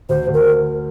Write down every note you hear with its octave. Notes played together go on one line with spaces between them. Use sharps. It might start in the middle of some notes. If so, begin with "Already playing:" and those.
D2 C5
D2
A#4